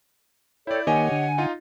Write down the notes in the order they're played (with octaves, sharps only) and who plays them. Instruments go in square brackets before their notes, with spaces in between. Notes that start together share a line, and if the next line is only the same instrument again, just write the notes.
[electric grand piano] E4 D5 [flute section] A4 C#5 [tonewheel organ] G5
[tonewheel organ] D#3 A#3 [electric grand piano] G4 C#5 D#5 [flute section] F#5 G#5
[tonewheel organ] D3
[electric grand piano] D#4 F4